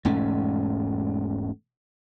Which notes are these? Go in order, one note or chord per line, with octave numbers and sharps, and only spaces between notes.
E1 G#2 A3 C#4